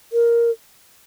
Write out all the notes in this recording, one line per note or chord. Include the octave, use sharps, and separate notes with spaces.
A#4